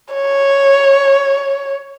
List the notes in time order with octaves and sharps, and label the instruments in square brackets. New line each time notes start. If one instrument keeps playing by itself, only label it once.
[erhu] C#5